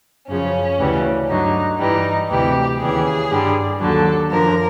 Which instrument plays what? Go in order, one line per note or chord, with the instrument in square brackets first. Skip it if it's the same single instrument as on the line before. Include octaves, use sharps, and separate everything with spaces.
[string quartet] F#2 C#3 F3 C#4
D2 C#3 E3 G3
G2 D3 F#3 D#4
G2 E3 G3 D#4
D2 C3 E3 G3 G4
D#2 C#3 E3 G3 G#4
G2 D3 G3
D#2 D3 F#3 A4
F#2 D3 F3 A#4